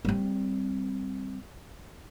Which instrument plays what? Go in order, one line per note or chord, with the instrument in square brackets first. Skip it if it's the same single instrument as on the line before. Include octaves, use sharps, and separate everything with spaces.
[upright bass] G3 C4